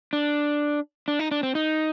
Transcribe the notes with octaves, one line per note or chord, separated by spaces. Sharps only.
D4
D4
D#4
D4
C4
D#4